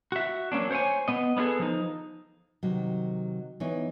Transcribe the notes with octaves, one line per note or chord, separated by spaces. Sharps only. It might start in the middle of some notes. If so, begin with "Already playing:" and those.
F#4 E5
F#3 A#3 C#4 D4
C5 C#5 F5 G#5
B3 D#5
B3 C#4 E4 G#4 A4
F3 D#4
C3 D#3 F#3
E3 B3 D#4 C#5